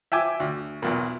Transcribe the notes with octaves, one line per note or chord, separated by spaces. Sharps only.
E5 G5 G#5 D6
D2
B1 E2 A#2